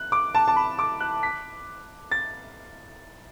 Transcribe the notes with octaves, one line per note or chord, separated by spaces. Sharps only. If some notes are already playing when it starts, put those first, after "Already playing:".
Already playing: F#6
D6
A5
A5
B5
D6
F#6
B6
A6